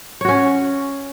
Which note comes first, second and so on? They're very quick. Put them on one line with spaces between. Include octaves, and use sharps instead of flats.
C#5 F#4 C#4